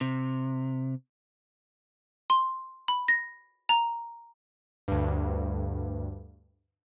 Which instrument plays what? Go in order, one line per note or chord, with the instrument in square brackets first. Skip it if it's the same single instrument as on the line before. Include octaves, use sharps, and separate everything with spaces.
[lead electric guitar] C3
[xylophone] C6
B5
A#6
A#5
[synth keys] D2 G2